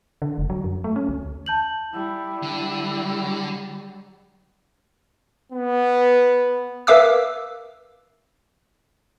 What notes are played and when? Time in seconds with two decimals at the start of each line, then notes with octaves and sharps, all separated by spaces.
0.22 D3
0.38 F1
0.50 F#3
0.64 F#2
0.84 A3
0.96 C#4
1.09 D2
1.46 A5 G6 F#7
1.93 G3 E4
2.43 D3
5.52 B3
6.87 A#4 B4 E5 F5 D6 E6